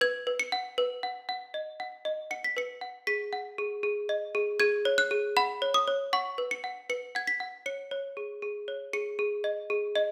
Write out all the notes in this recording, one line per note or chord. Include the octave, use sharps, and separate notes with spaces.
B4 G#6
B4
C#7
F#5
B4
F#5
F#5
D#5
F#5
D#5
F#5 C#7
B6
B4 C#7
F#5
G#4 B6
F#5
G#4
G#4
D#5
G#4
G#4 G#6
C#5
F#6
G#4
F#5 B5
C#5
D#6
C#5
F#5 C#6
B4
C#7
F#5
B4 C#7
F#5 G#6
B6
F#5
C#5 C#7
C#5
G#4
G#4
C#5
G#4 C#7
G#4
D#5
G#4
D#5